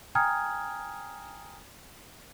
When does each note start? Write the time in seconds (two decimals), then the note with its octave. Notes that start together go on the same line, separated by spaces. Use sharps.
0.15 G5 G#5 A#5 D#6 F6 G#6